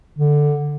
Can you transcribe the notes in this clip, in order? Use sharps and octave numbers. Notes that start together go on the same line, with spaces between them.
D3